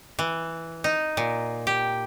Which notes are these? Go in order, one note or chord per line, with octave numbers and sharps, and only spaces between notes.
E3
D#4
A#2
G4